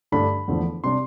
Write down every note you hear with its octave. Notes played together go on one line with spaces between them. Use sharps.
G2 D3 A3 D4 B5
E2 D3 F3 A3
C3 G3 D4 C6